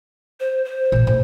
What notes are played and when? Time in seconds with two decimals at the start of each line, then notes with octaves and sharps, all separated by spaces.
0.40 C5
0.65 C5
0.92 A#2 F4
1.07 A2